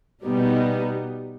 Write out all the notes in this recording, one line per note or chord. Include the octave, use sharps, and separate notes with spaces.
B2 G3 B3 D#4